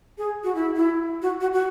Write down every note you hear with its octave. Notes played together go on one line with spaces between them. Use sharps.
G#4
F#4
E4
E4
F#4
F#4
F#4